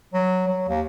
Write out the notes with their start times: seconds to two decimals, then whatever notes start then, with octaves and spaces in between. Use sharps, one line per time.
0.14 F#3
0.47 F#3
0.68 D#2